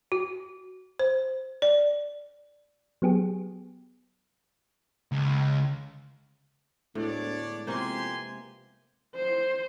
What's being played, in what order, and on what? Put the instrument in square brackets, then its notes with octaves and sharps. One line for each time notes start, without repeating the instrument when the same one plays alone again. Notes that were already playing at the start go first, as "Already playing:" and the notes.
[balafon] F#4
C5
D5
[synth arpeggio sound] F#3 B3 G4 G#4
[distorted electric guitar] C#2
[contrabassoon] D2 [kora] A2 [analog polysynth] G#3 B3 [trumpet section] D4 C#5 D5
[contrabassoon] F2 [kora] C3 A#3 C5 [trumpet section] G4 G#5 C6
[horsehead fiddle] C5